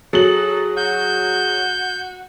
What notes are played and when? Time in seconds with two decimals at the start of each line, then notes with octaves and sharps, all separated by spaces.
0.13 F#3 G#4 A4 F#7
0.77 F#4 G6